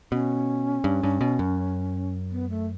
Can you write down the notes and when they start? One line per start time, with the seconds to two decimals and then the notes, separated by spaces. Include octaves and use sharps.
0.12 B2 C#4
0.84 G2
1.03 G2
1.21 B2
1.39 F#2
2.32 B3
2.50 A3